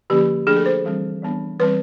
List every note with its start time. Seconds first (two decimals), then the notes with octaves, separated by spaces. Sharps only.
0.10 D3 F3 A#3 C#4 G4
0.47 F3 A3 D4 G#4
0.56 A4
0.66 C5
0.85 E3 G3 C4
1.22 E3 G3 B3 D4
1.59 E3 G3 C4 B4